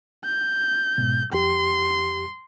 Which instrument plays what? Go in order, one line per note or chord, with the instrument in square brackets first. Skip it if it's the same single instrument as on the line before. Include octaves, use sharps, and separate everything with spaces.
[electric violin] G6
[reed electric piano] G#2 B2
[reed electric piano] F2 G4 [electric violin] C6